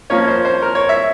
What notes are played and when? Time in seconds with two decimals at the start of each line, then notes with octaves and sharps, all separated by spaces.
0.10 F3 A#3 C#4 C#5
0.28 C5
0.45 C5
0.62 A#4
0.75 C#5
0.89 E5